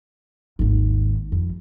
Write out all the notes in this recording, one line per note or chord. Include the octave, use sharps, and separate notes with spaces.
G#1 D#2
F2